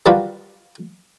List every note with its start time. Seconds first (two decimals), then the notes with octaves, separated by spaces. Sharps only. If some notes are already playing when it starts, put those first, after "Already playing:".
0.06 D#3 G3 D4 F4 F#4 B4